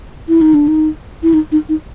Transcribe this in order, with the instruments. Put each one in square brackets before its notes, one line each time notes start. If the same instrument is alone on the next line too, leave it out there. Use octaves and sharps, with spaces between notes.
[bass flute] E4
D#4
D4
D#4
E4
D#4
D#4
D#4